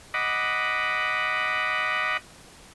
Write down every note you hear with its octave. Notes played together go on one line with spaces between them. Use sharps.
D#5 F#5 B5 D6